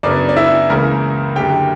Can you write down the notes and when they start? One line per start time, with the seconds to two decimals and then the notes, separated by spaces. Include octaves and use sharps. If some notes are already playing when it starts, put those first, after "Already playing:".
0.03 F#2 C#3 F#3 B3 D4 D5
0.29 D5
0.36 E4 E5
0.70 C#2 C#3 E3 A#3 A#4 A#5
1.36 F#1 F#2 D3 G4 G5